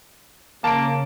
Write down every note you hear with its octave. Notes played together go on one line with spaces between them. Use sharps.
C#3 A#3 A5 D7